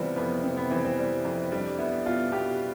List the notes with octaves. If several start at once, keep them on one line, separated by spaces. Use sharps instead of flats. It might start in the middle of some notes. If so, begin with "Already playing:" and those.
Already playing: C3 E3 G3 B3 C4 F4
F2 B3
C3 C4
B3
E3 C4
C4
G3
F2
G3 D4
B3 E4
B2 F4
B2 G4